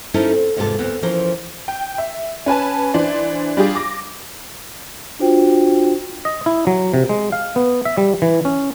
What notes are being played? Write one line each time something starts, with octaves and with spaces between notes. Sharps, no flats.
C#4 D#4 E4 A4 A#4 C5
C4
E2 G#2 C3 G#3 F4 A4
D2 B3 C4
E3 F3 C#4 A#4 C5
G5
E5
C#4 B4 G#5 A5
E3 D4 C5 D5
G3 D4 F4 G4 G#4
D6 A#6
D4 F4 F#4 C5 G5
D#5
E4
F#3
C3
G#3
F5
B3
E5
G3
E3
C#4